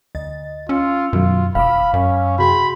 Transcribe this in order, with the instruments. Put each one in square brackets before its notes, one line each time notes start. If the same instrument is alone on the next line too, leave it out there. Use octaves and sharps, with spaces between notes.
[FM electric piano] D2 D#5 A6
[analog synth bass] C#4 [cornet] F4 [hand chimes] E6 C#7
[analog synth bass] F#2 [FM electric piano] B2 D#3 F#3 [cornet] F4
[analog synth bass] E1 [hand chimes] F5 [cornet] B5 [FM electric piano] D6 E6 F6
[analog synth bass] F#2 [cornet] C#4
[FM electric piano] C3 G#4 G5 [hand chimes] F#4 C6 [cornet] B5